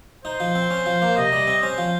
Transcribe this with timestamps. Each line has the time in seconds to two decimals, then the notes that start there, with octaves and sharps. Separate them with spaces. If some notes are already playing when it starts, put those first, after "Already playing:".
0.25 D#4 C5
0.40 F3
0.55 C4
0.71 C#4
0.86 F3
1.02 A#3
1.17 C3 D#5
1.32 G3
1.47 C4
1.63 C#4 C5
1.78 F3